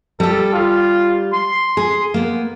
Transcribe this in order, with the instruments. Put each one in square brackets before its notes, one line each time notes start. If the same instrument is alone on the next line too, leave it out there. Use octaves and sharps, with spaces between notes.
[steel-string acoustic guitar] G3 G4 [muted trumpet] A4
[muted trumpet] F4
C6
[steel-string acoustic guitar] G#4
A#3 B3